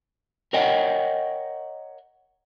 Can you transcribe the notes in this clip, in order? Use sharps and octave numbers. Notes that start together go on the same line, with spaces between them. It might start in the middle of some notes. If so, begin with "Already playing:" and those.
A#4 C#5 D#5 F#5 G5